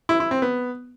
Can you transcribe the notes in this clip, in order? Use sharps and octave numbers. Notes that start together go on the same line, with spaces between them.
E4
E4
C4
B3